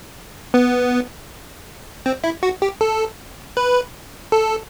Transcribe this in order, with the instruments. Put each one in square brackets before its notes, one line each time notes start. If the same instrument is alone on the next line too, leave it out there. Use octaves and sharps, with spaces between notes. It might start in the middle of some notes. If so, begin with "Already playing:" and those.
[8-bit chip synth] B3
C4
E4
F#4
G4
A4
B4
A4